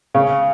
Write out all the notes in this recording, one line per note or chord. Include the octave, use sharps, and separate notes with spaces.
C#3